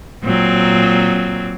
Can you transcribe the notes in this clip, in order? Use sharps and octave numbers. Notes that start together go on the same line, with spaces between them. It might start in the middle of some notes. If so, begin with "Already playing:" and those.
A#2 F#3 C4